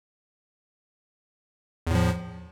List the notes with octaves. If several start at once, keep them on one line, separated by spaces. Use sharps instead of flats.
E2 A2 F3